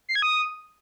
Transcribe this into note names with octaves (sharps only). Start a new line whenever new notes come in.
C7
G#6
D#6